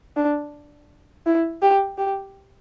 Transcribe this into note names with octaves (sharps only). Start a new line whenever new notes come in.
D4
E4
G4
G4